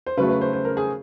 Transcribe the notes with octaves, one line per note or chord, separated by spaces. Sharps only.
C5
C#3 F#3 A3 B4
B4
C5
C5
A#4
G#4